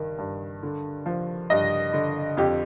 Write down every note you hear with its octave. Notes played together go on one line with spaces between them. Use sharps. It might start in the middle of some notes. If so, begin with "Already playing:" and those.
Already playing: G2 D#3
G2
D3
F3
G2 D#5
D3
F2 G4